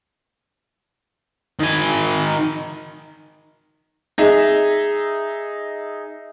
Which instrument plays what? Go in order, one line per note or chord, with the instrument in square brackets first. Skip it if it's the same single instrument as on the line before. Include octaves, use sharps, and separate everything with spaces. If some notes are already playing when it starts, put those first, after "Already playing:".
[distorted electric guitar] D#3 G#5
[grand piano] D#4 G#4 D#5 E5